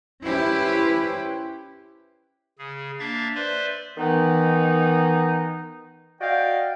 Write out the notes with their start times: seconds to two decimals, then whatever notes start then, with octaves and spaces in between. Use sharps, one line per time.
0.23 C#4 E4 G4 B4 C5
2.59 C#3 G#4
2.99 A#3 D4 E5 F5 A6
3.35 B4 C5 D5 E5 C6
3.97 D#3 E3 B3 D#4
6.21 F#4 D5 D#5 F5 G5